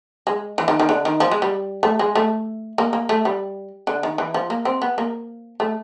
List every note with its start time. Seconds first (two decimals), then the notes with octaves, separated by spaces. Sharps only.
0.27 G#3
0.58 E3
0.68 D#3
0.80 D#3
0.89 D3
1.05 D#3
1.20 F3
1.31 G#3
1.42 G3
1.83 A3
1.99 G#3
2.15 A3
2.78 A#3
2.93 A#3
3.09 A3
3.25 G3
3.87 D3
4.03 D#3
4.18 E3
4.34 F3
4.50 A#3
4.65 C4
4.82 B3
4.98 A#3
5.60 A3